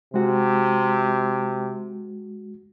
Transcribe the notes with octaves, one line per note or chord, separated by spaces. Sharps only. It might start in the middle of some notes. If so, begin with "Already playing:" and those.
C3 G#3 F#4